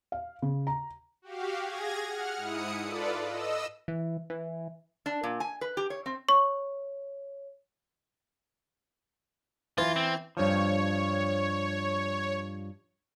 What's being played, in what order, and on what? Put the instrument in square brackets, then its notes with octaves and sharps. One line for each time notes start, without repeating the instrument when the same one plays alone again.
[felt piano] F5
C#3
A#5
[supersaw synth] F#4 G4 F5
G#4 G#6 A#6
F#5 F6
G#2 E4 D#6 C#7
F4 A4 B4 D5
D#5 E6
[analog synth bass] E3
E3
[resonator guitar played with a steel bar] D4
A#2
G#5
B4
G4
C#5
C4
[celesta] C#5 [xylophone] C#6
[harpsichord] E3 [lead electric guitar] F4
[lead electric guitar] C4
[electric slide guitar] G2 F3 [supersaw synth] C#5